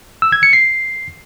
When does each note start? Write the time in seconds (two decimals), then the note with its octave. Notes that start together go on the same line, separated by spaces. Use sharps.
0.22 E6
0.32 G#6
0.43 C#7
0.53 C7